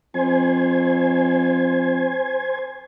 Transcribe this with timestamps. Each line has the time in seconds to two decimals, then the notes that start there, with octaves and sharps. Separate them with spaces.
0.14 F2 C5 G#5